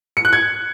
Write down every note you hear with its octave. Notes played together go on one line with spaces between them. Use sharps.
C#7
F#6
G#6